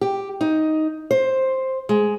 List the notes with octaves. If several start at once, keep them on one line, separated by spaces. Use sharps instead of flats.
G4
D#4
C5
G#3